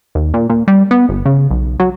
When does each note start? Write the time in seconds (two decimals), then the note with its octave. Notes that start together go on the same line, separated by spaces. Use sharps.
0.15 D#2
0.34 A#2
0.50 A#2
0.68 G3
0.91 B3
1.09 G1
1.26 C#3
1.51 B1
1.80 F#3